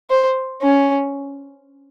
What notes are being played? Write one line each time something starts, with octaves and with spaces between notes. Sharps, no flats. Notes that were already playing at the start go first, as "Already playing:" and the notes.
C5
C#4